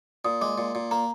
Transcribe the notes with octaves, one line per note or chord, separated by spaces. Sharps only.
A#2 D#6
G#3 D6
A#2
A#2
A#3 A#5